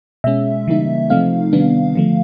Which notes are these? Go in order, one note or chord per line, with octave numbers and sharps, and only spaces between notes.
B2 G#3 C#4 E5
C#3 E3 G3 A#3 D#4
C3 F3 A3 C4 D#4 F5
C3 D#3 G3 B3 D4
D3 F3 A3